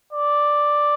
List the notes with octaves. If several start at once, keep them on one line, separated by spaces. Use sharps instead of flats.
D5